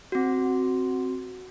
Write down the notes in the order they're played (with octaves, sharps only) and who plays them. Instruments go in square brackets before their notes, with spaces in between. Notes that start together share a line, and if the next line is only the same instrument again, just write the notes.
[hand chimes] C4 F#4